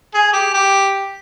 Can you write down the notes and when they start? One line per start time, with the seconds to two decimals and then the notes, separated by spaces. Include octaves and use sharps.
0.14 G#4
0.33 G4
0.54 G4